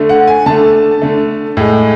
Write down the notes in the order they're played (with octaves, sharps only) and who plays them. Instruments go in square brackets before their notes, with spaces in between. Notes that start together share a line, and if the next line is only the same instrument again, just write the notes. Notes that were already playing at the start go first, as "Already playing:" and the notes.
Already playing: [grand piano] D3 A3
F#5
G#5
D3 A3 A5
D3 A3
A2 G#3